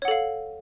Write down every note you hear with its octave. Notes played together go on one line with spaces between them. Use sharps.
A4 C#5 F5 F#5